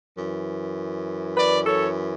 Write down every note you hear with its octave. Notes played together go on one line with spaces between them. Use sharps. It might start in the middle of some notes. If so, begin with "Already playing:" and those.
F#2 E3
B4 D5
A4 C#5